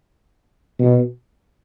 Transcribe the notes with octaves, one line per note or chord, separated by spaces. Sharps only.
B2